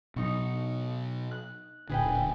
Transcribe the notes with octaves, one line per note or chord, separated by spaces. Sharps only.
B2 F#3 D#4 C#6 C#7
F#6
D1 A#2 D3 G#4 B4 G5